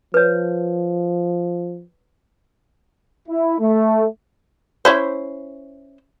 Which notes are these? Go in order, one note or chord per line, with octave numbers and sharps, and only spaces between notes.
F3 B4 C#5
E4
A3
C#4 E4 C5